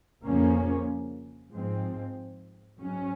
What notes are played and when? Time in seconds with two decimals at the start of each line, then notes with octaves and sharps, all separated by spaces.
0.25 F2 C#3 F3 A#3 C#4
1.51 G#2 F3 G#3 C4
2.79 G#2 F#3 C#4